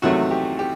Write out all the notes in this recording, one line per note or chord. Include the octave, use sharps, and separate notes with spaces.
E2 C3 D#3 F#3 A3 F#4
G4
G4